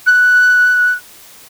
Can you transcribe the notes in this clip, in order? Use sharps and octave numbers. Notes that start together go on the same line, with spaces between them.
F#6